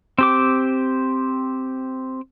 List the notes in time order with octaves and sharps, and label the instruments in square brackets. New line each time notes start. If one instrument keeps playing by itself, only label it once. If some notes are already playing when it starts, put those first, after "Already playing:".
[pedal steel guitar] C4 G4 D6